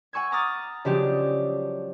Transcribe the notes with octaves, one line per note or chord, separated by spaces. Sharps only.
F#5 G#5 C#6 E6 G#6
A#5 D6 D#6 F6 F#6 A6
C#3 F3 F#3 G#3 D4 G4